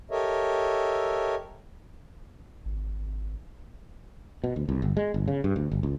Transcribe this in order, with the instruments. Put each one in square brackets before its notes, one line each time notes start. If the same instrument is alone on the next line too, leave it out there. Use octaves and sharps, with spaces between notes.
[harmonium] G4 A4 A#4 C#5 D#5 E5
[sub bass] G#1
[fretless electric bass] B2
D2
C2
G1
G#3
G1
C#3
G2
D2
G1
C#2